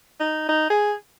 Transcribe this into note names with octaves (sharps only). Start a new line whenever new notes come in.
D#4
D#4
G#4